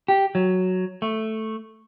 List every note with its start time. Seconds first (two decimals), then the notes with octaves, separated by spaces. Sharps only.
0.08 G4
0.35 F#3
1.02 A3